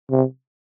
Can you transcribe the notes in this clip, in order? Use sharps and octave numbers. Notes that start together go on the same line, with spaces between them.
C3